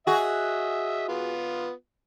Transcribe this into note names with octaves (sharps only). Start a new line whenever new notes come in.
F#4 G#4 D#5 E5
B3 F4